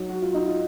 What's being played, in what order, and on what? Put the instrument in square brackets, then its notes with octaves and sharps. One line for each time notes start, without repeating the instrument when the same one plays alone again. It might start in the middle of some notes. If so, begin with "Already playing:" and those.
Already playing: [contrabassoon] F#3 [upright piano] D#4
[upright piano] F#4
F4
D#4
F4